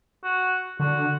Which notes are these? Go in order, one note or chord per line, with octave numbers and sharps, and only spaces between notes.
F#4
D3 F#4